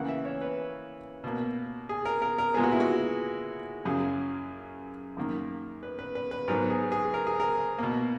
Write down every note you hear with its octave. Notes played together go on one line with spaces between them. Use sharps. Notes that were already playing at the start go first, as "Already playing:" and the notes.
Already playing: C#3 E3 A#3 F#5
E5
C#5
B4
B2 A#3
G#4
A#4
A#4
A#4
A#2 G#3 B3 G#4
F#4
E4
F#4
F#2 C#3 F#3 G#4
F#2 D#3 A#3
B4
B4
B4
B4
G#2 F#3 B3 A#4
G#4
G#4
A#4
G#4
A#4
B2 A#3